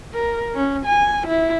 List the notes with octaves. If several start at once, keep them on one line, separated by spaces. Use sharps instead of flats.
A#4
C#4
G#5
E4